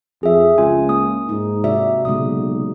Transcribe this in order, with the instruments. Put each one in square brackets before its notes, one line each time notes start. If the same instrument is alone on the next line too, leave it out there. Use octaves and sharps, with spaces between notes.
[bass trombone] F2 [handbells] G#4 E5
[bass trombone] C#2 [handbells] F4 G#5
[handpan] A#3 [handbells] D#6
[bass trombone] G#2 [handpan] D#4
[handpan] C3 F#4 D5 [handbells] E5
[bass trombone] B1 [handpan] A#2 C#3 G#3 [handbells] D#6